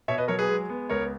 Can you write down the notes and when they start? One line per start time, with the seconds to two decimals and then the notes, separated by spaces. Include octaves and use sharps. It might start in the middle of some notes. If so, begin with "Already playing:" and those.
0.08 B2 C#5 E5
0.18 B4 D#5
0.28 F#3 A#4 C#5
0.39 G#4 B4
0.49 G#3
0.69 B3
0.90 C#2 A#4 C#5